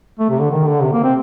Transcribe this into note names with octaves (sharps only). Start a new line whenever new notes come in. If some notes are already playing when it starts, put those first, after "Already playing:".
A3
C3
D3
D#3
D3
C3
A#3
C4